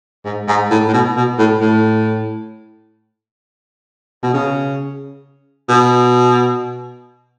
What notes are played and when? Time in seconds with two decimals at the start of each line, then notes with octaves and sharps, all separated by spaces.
0.25 G#2
0.48 G#2
0.71 A2
0.88 A2
0.94 B2
1.16 B2
1.38 A2
1.61 A2
4.23 B2
4.34 C#3
5.69 B2